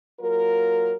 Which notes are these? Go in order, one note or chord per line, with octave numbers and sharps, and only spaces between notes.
F#3 A#3 F4 A#4